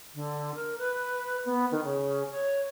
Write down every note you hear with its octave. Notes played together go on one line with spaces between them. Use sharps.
D3
A#4
B4
B3
D#3
C#3
C#5